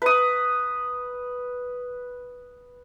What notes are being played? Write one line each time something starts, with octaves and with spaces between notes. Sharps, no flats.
B4 D#6